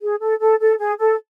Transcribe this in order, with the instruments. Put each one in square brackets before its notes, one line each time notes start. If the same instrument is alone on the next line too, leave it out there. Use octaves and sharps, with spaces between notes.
[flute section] G#4
A4
A4
A4
G#4
A4